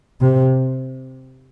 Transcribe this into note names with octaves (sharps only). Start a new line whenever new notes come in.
C3